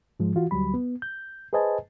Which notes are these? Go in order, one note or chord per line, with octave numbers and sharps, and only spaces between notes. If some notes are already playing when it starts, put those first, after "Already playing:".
G#2 F3 G#3
E3 F4 F#4
D2 F#3 G3 B5
B3
G6
G#4 B4 C5 D#5 G#5 A5